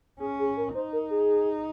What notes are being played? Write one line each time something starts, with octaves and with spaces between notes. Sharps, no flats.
C#4 G#4
G#4
A#4
D#4 C5
A#4
G#4